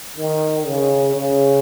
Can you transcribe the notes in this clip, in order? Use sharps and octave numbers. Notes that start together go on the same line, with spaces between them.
D#3
C#3
C#3